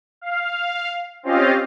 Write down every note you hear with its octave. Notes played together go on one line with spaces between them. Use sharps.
F5
C4 C#4 F4 G4 D#5 F5